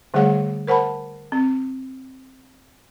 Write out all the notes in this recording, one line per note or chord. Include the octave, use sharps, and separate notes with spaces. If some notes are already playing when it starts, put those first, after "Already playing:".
D3 G3 A3 G#4 C#5 F#5
A#4 C5 F#5 A5 B5
C4